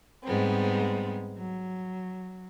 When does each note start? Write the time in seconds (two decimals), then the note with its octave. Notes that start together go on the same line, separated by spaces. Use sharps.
0.24 G#2 G3 G#3 B3 C4
1.37 F#3